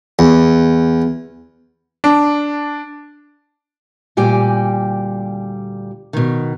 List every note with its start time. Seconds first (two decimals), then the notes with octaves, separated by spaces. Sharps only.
0.19 E2
2.04 D4
4.17 D2 A#2 G3 G4 G5 G#5
6.13 B2 D#3